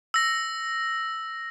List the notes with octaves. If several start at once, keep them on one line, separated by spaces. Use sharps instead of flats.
E6 A#6